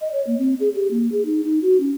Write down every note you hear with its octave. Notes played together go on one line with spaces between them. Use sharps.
D#5
C#5
A#3
C4
G#4
G4
A#3
G#4
D#4
D#4
F#4
C#4